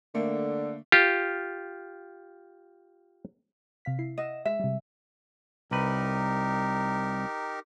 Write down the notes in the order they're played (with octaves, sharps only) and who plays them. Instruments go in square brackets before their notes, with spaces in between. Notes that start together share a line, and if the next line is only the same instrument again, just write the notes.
[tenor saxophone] D3 [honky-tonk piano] A3 A#3
[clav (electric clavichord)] F4 G4
[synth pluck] C3 F5 B6
E4 C7
[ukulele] D#5 [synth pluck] E5 F#5 E7
[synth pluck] G#3 [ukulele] E5
[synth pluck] C3 G3
[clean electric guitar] C2 B4 [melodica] D#4 G4 A#4